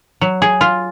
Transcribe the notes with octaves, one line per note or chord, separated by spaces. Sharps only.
F#3
G#4
F4